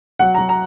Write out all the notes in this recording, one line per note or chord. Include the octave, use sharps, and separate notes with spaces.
F#3 F#5
F#3 A#5
A#5